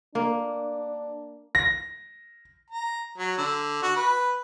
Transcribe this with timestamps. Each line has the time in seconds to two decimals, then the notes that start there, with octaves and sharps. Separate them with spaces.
0.15 A#3 D4
1.55 A#6
2.70 A#5
3.18 F#3
3.38 D3
3.82 F#4
3.96 B4